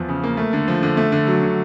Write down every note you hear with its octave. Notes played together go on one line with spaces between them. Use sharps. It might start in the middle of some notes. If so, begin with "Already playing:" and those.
Already playing: E2 F3
C#3
A#3
A3
D3
F3
D3
A3
D3
F#3
D3